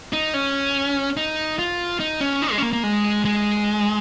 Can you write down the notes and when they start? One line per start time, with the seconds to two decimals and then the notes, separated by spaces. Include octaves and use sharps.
0.13 D#4
0.34 C#4
1.17 D#4
1.59 F4
2.00 D#4
2.21 C#4
2.42 D#4
2.51 G#3
2.58 C#4
2.62 A#3
2.73 A#3
2.83 G#3
3.25 G#3